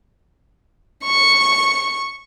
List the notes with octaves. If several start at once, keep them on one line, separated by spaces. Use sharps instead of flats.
C#6